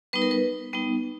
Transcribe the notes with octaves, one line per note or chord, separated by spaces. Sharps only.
G3 B3 D#4 B4
A#4
B4
G3 B3 D#4